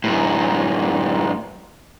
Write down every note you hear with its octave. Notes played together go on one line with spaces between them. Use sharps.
F#2 A2